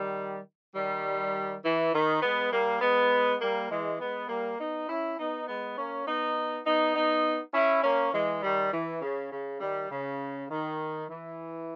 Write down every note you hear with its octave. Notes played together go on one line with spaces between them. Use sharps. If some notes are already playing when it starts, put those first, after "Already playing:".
Already playing: D#3 G3
D#3 G3
E3
D#3
G#3 B3
G3 A#3
G#3 B3
G3 A#3
E3 G#3
G#3 B3
G3 A#3
B3 D#4
C#4 E4
B3 D#4
G#3 B3
A#3 C#4
B3 D#4
B3 D#4
B3 D#4
C#4 E4
A#3 C#4
E3 G#3
D#3 G3
E3
C#3
C#3
D#3 G3
C#3
D#3
E3